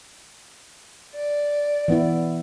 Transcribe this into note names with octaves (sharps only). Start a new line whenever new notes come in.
D5
E3 B3 E4